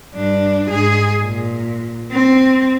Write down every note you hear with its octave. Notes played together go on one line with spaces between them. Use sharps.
G2 D4
G#2 G#4
A#2
C4